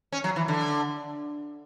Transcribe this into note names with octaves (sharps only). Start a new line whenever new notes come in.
C#4
F#3
E3
D3